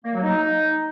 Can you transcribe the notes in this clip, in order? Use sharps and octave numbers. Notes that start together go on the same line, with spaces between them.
A#3
F#3
D#4